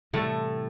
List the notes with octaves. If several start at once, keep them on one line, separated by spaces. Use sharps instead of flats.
A2 C3 E3 G3 A3